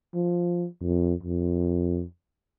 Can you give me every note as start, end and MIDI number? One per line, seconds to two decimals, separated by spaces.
0.15 0.67 53
0.81 1.14 41
1.23 2.04 41